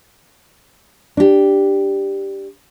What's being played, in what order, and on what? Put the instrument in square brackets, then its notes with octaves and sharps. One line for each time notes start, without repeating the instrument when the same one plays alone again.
[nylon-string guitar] D4 G4